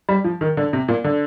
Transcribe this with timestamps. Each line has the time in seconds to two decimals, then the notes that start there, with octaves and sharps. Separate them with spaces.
0.09 G3
0.24 F3
0.41 D#3
0.57 D3
0.73 C3
0.88 A#2
1.04 D3